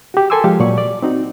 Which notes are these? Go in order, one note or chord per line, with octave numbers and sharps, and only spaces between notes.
F#4 G4
A4 A#4 G#5 C6 D6 E6
F3 G#3 G4 F5
A#2 F#3 D5 C#6
D5
C4 D#4 F#4